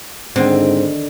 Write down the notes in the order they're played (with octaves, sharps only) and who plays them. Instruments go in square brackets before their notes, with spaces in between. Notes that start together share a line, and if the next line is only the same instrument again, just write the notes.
[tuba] G#2 [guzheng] D3 D#3 [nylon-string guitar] C4